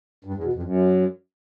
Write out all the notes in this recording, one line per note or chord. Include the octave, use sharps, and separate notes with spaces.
G2
E2
B2
F2
F#2